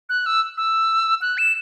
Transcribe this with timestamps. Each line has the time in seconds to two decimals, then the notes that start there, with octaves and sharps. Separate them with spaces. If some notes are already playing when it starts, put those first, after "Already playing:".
0.09 F#6
0.26 E6
0.57 E6
1.21 F#6
1.38 E7